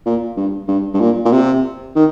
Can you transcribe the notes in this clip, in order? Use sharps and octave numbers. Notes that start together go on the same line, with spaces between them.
A#2
G2
G2
G2
A#2
A#2
C3
D#3